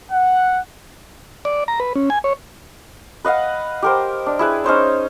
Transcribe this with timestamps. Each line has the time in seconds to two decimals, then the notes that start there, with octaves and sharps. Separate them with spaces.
0.11 F#5
1.45 D5
1.68 A#5
1.80 B4
1.96 C#4
2.10 G#5
2.24 C#5
3.25 B4 D#5 F5 F#5
3.82 G4 A#4 C5
4.26 D4
4.39 E4 G#4 B4
4.64 C#4 D#4 C5 C#5